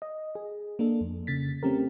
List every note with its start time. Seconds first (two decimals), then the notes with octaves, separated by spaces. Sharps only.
0.02 D#5
0.35 G#4
0.79 A#3 D4 A4
1.01 F2
1.27 C#3 A6 B6
1.63 A3 C4 C#4 G4 A#4